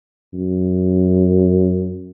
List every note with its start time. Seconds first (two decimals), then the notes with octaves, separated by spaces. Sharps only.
0.33 F#2